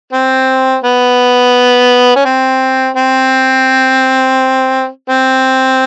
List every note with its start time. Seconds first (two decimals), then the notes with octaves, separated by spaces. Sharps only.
0.13 C4
0.84 B3
2.16 C#4
2.25 C4
2.97 C4
5.09 C4